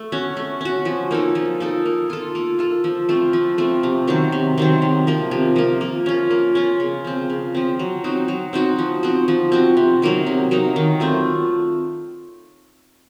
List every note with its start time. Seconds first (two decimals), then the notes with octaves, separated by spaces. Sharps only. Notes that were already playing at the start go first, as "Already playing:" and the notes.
Already playing: A3
0.12 C#4 F#4
0.37 A3
0.61 C#4 F#4
0.85 F3
1.11 A#3 D#4 A4
1.35 F3
1.60 A#3 D#4 A4
1.86 A#3
2.10 F4 A4
2.35 A#3
2.59 F4 A4
2.84 F3
3.09 A3 C4 F4
3.33 F3
3.58 A3 C4 F4
3.83 C3
4.07 D#3 F#3 C4
4.32 C3
4.58 D#3 F#3 C4
4.82 C3
5.07 F3 A#3
5.31 C3
5.56 F3 A#3
5.81 A#3
6.06 C#4 F4
6.31 A#3
6.55 C#4 F4
6.80 C#3
7.04 F3 C4
7.30 C#3
7.55 F3 C4
7.79 F#3
8.04 C4 D#4 F#4
8.28 F#3
8.53 C4 D#4 F#4
8.78 F3
9.03 C4 F#4
9.28 F3
9.52 C4 F#4
9.77 C3
10.02 F#3 A#3 D#4
10.27 C3
10.51 F#3 A#3 D#4
10.76 D#3
11.00 A3 C4 F4